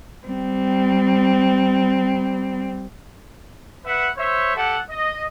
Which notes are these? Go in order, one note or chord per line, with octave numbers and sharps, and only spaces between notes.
G3 C4
B4 E5 F#5
C5 C#5 E5
G4 A4 F#5
D#5